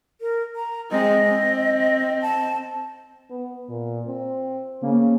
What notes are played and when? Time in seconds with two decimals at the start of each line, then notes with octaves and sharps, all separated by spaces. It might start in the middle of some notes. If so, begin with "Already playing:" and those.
0.21 A#4
0.55 A#5
0.91 G#3 C4 D#5
1.27 C4
2.22 A5
3.30 B3
3.69 A#2
4.07 C4
4.82 C#3 A#3